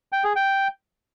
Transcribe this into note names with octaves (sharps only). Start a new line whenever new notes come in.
G5
G#4
G5